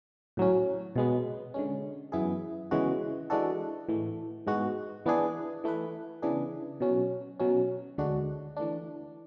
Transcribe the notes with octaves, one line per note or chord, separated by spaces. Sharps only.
A2 F#3 C#4
B2 G#3 B3
D3 G#3 C#4
F#2 E3 B3 E4 G#4
C#3 E3 G#3 B3 F#4
E3 G#3 D4 F#4 A4
A2 E3 A3
G#2 G#3 B3 F#4
E3 B3 D4 G#4
E3 A3 E4 B4
C#3 E3 B3 D4 G#4
B2 F#3 C#4
B2 F#3 C#4
D2 D3 G#3 D4 F#4
E3 A3 D4